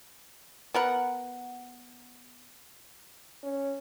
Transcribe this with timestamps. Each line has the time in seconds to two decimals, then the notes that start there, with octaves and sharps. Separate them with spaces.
0.74 B3 A#4 F#5
3.43 C#4